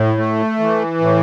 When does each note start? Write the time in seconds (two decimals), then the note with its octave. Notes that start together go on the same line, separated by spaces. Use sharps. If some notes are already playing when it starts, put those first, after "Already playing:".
Already playing: A2
0.17 A3
0.59 E3
1.01 A2